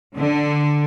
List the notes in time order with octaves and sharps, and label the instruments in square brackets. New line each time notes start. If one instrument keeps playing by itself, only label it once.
[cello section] D3